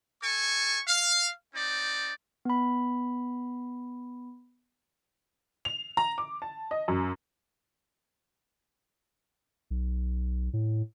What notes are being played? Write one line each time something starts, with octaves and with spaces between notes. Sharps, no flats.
A4 G#5 C#6
F5
C4 D#4 D5
B3 B5
F7
A#5
D6
A5
D#5
F#2
B1
A2